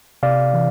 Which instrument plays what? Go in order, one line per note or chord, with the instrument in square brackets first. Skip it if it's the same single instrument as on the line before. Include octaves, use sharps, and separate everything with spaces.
[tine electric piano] C3 D5 F5
E3